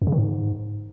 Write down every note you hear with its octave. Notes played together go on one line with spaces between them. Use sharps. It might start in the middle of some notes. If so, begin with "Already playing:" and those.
F#2
C#3
D#3
G#2